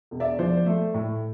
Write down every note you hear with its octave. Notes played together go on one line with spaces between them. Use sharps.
E1
D5 E5
F3 C5 D5
A3
A2